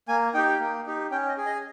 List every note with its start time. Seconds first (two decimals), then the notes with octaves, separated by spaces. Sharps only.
0.08 A#3 G#5
0.34 D#4 G4 G5
0.60 A#3
0.86 D#4 G4
1.11 C#4 G5
1.29 D#5
1.37 G#4
1.46 D#5